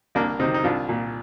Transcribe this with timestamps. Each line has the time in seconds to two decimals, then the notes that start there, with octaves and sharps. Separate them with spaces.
0.15 C2 A#3 D4
0.39 C3 C4 D#4
0.43 D#3
0.54 D#4
0.64 C2 D4 F4
0.89 A#2